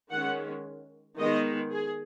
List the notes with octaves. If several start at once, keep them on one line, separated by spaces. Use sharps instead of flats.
D#3 G#3 C#4 F#5
D#3 G#3 B3 D#5
G#4